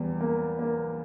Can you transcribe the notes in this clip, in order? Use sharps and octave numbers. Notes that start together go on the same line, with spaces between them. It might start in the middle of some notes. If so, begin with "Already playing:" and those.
Already playing: E2 G3
A#3
A#3